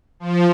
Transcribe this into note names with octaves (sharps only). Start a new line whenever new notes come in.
F3